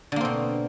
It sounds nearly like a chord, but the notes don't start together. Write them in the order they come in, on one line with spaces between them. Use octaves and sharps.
D3 A#3 C4 B2